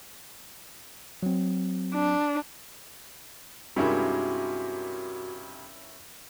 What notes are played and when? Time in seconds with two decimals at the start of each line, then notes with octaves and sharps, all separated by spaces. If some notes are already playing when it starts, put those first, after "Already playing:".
1.23 F#3 C4
1.95 D4
3.76 G2 C3 G#3 C#4 E4 F#4 A#4 D6